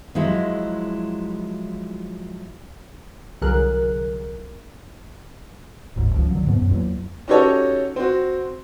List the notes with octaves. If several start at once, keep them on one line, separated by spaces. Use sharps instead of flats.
F3 F#3 G#3 E4
C2 D3 F#3 G#4 A#4 F#6
F#1 D2 G#2
C#2 F3
D3 E3 F#3
F2 G#2 B2 B3
F#2
E2 F#3 A#3
C#4 D#4 F#4 G4 A4 C#5
C4 F#4